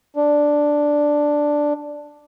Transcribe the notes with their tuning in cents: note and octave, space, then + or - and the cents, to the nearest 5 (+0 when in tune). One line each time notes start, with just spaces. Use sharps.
D4 +0